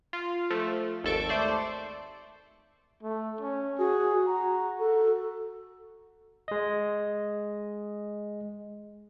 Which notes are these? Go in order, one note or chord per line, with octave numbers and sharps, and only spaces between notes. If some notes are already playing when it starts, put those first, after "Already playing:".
F4
F3 A3
G#1 D#2 A4 C#6 D7
A3 C5 D5
A3
C#4
F#4 G#4
F#4 A#5
A4
G#3 D#5